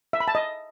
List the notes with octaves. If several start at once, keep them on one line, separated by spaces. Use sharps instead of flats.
E5
B5
A5
D#5